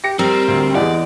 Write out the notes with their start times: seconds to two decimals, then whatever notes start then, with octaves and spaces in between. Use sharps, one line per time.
0.04 G4 A#6 C#7
0.19 G3 C4 A#4
0.48 D2
0.75 E2 G#3 D5 F#5